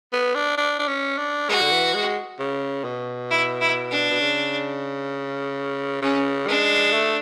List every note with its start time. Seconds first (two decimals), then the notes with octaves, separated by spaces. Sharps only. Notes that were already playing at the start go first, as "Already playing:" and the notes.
0.13 B3
0.35 D4
0.58 D4
0.79 D4
0.88 C#4
1.18 D4
1.49 G#3 F#4
1.61 D3
1.72 E3
1.94 G#3
2.39 C#3
2.85 B2
3.31 E4
3.61 E4
3.91 D4
4.10 B2
4.21 C#3
6.02 C#3 C#4
6.47 G#3 D4
6.93 A3